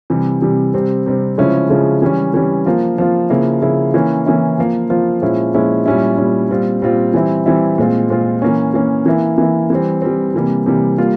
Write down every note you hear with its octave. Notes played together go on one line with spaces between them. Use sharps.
C3 E3 G3
C3 E3 G3
C3 G3 C4
C3 G3 C4
C#3 F3 G#3 C#4 E4
C#3 F3 G#3 C#4 E4
E3 G3 C#4
E3 G3 C#4
F3 A#3 F4
F3 A#3 F4
C#3 F3 A#3 E4
C#3 F3 A#3 E4
E3 A#3 C#4 E4
E3 A#3 C#4 E4
F3 A#3 F4
F3 A#3 F4
A#2 F3 G#3 C#4 E4
A#2 F3 G#3 C#4 E4
A#2 G3 C#4 E4
A#2 G3 C#4 E4
A#2 G3 C4 F4
A#2 G3 C4 F4
E3 G3 C4 E4
E3 G3 C4 E4
A#2 G#3 C4 F4
A#2 G#3 C4 F4
E3 A#3 C#4
E3 A#3 C#4
E3 A#3 E4
E3 A#3 E4
E3 G3 C4
E3 G3 C4
C3 E3 G3 A#3
C3 E3 G3 A#3
G3 A#3 F4